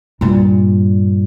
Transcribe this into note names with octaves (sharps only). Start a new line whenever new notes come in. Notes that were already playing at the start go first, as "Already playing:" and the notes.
G2 A#2